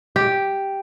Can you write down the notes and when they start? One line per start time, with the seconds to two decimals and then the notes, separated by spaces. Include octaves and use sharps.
0.16 G4